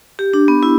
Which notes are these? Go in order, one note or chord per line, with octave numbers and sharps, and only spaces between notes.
G4
D4
B3
E4